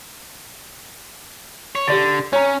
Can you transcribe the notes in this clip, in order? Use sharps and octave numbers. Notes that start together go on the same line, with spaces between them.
C#5
D3 G4 D5 A6
C#4 C#5 A#5